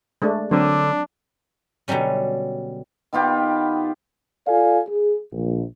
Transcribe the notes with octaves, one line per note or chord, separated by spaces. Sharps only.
G#3 A3 D4
D3 F#3 C4 D4 A#4
B2 D3 F#3 G3 C#4
D#3 B3 F4 G4
F4 A4 D5 F5 G#5
G#4
A#1